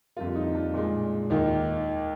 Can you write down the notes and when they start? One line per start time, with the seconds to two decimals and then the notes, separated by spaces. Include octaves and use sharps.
0.16 F2 D3 G3 A#3 F4
0.35 D#4
0.55 D4
0.74 A#2 G#3
1.30 D#2 D#3 A#3 D#4